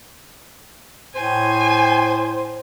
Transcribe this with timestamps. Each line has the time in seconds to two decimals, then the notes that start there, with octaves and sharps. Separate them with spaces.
1.15 A2 C5 G#5